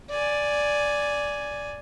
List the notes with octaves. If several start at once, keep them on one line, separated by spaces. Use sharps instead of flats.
D5 G#5